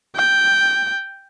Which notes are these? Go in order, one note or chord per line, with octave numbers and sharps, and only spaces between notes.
G5